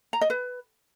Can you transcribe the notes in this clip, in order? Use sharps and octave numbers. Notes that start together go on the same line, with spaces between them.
A#5
D#5
B4